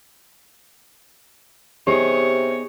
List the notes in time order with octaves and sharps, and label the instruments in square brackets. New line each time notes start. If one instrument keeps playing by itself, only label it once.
[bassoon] C3 [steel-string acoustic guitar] B3 D#4 G#4 [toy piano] G4 [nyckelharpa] C#5